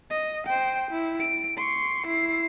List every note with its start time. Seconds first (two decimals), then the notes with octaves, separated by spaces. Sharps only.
0.10 D#5
0.47 C5 G5
0.91 E4
1.20 D7
1.57 C6 C#6
2.07 E4 C7